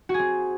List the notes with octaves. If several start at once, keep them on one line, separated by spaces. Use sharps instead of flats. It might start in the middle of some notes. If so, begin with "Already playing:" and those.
F#4
G#4
C4